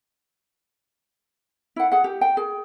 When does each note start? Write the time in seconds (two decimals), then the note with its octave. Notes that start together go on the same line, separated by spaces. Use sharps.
1.76 E4 F#5
1.92 G#4 F#5
2.04 G4
2.21 G5
2.37 G#4